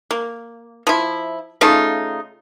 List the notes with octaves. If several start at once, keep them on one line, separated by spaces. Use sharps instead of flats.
A#3
F3 E4
C#3 A3 D#4 F4